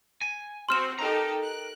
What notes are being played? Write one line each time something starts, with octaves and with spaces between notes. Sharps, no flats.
G#5
C4 F#4 C6 F6 E7
D#4 G4 A4 A#4 A#5
F#6